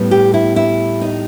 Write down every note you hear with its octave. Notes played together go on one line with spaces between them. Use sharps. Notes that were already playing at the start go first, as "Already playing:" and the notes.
Already playing: A2 G3 B3
G4
E4
E4
D#4